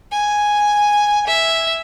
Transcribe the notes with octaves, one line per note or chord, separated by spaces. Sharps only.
G#5
E5